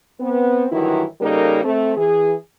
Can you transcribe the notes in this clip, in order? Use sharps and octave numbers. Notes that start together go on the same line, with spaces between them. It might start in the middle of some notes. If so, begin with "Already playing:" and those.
B3 C4
G2 D#3 E3 F#3 E4
C#3 G3 A#3 D#4 A4 A#4
A3 C4
E3 G#4